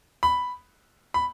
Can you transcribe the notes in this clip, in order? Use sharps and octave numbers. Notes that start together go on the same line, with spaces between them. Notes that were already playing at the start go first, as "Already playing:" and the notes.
B5
B5